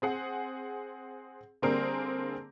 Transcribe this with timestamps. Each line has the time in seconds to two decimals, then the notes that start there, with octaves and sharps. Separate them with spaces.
0.02 C4 G#4 F#5
1.62 D3 G3 A#3 C4 G#4 A#4